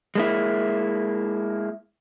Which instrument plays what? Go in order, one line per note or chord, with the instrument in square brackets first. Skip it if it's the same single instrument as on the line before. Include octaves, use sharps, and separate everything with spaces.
[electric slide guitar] G#3 A#3 E4